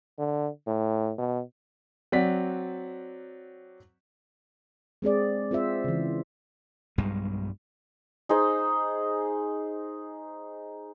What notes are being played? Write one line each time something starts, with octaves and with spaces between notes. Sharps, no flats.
D3
A2
B2
F#3 C4 D5 F#5 B6
G#3 C4 G#4 D5
C4 F4 C5 E5
C#3 E3
B1 G2 G3 G#3
D#4 G#4 C5 D#5